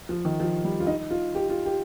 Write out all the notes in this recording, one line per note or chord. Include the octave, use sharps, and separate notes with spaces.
F3
D#3
F3
G3
F4
D#4
F4
G4
F4
G4